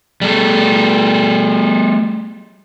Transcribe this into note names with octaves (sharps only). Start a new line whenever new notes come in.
G3 A3